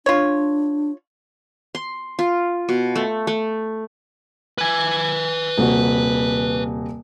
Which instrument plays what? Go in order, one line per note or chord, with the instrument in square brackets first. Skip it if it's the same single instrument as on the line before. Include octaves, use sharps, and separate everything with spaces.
[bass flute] D4 [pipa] F4 C#5
[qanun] C6
F4
B2
A3
A3
[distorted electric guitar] B4 G#5
[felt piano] D#1 C3 F#4